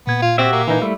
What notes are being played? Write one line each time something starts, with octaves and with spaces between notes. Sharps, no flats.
A#2 B3 G#6
F4
C4 F#4 G4 E5
A#3
E3 D#4
G3 A3 E4